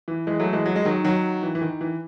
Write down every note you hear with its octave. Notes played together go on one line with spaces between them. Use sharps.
E3
E3 G#3
F#3 A3
E3 G#3
F#3
G#3
D#3 F#3
D#3 F#3
E3
E3
D#3
E3